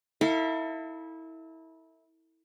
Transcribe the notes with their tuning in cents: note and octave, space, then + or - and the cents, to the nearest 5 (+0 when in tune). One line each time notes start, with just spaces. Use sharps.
E4 -25 A4 +35 F5 -15